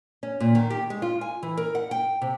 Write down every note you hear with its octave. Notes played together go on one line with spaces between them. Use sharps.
C#4
A#2
D#3
G4
G#3
F4
G#5
E3
A#4
F#5
G5
C3